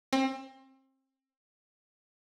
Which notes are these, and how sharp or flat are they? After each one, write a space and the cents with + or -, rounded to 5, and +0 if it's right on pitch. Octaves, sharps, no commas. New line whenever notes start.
C4 +30